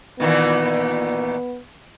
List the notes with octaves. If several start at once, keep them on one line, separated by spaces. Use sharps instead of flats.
A#2 D#3 E3 B3